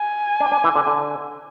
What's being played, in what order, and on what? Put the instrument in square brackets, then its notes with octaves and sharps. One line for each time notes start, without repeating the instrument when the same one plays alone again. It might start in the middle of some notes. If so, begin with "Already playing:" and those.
Already playing: [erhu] G#5
[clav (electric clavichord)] D4
D4
E3
D3
D3